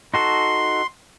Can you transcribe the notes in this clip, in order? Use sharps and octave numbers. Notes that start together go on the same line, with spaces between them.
D#4 F#4 A4 C6